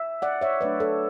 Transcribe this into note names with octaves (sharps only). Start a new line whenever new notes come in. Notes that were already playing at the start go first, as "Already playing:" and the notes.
Already playing: E5
D5 F#5
C#5 E5
F#3 A3 D4 B4 D5
A4 C#5